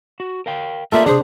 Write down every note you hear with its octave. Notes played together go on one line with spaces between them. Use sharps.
F#4
A#4 F5 G5
A3 A#3 F4 G#4 A4 D5 E5
C3 D#3 D4 G#4 C5